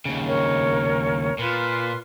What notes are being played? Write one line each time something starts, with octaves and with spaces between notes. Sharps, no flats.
D#2 C#3
A#4 C#5
A#2 F4 B4 C6